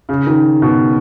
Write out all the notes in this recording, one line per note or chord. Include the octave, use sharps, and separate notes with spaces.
C#3
D#3
B2